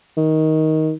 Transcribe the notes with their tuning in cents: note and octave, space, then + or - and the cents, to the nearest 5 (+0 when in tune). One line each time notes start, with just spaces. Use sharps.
D#3 +15